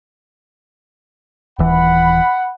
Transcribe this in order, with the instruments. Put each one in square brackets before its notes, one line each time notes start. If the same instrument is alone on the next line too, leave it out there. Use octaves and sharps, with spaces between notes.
[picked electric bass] D#1 E3 [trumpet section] F#5 B5